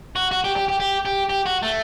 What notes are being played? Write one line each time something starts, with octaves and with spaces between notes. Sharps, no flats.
F#4
F#4
G4
G4
G4
G4
G4
G4
F#4
A3